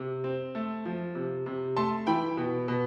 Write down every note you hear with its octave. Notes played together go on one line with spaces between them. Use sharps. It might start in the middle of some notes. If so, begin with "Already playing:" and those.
Already playing: C3
C4
A3
F3
C3
C3
A3 A5 C6
E3 G5 B5
B2
B2